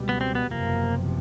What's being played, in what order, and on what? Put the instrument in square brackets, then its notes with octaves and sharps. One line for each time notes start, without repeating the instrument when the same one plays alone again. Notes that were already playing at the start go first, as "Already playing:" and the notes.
Already playing: [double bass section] C#2 B2 G3
[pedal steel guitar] B3
C4
B3
[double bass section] F#1 E2 C3 F3 [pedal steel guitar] A#3